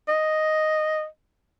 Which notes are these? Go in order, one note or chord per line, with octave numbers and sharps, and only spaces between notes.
D#5